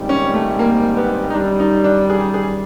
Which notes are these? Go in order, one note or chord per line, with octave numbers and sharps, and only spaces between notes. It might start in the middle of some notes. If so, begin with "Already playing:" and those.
Already playing: A#1 G#2 D#3 G3 C4
C#4
A3
A#3
B3
D#4
F#2 D#3 G3 D4
D#4
D4
G#4
G#4